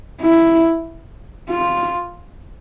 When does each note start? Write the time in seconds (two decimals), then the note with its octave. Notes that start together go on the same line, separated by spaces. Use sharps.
0.21 E4
1.49 F4